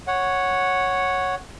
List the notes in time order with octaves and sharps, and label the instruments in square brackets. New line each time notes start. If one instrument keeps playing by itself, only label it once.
[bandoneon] C#5 F#5